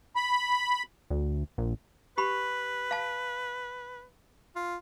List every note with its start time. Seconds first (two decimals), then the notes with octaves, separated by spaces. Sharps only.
0.16 B5
1.10 D2
1.58 A#1
2.18 G4 B4 B5
2.91 F5 A5
4.56 F4